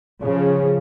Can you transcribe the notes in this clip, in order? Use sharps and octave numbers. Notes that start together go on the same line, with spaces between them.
C#3 F3 G#4 C#5